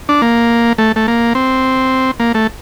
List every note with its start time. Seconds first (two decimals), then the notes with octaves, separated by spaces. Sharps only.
0.09 D4
0.22 A#3
0.78 A3
0.96 A3
1.08 A#3
1.35 C4
2.20 A#3
2.34 A3